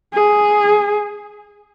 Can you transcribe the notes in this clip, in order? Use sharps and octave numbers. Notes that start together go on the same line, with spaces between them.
G#4